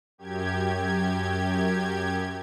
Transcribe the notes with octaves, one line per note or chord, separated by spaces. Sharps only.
F#2 G4 G#6